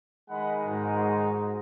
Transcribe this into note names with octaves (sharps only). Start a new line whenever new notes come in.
D#3 G#3 D#5 F#5 B5
G#2 D#4 F#4